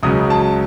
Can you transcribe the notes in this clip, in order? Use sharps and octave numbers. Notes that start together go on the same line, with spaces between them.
C#2 C#3 F#3 D#6
A5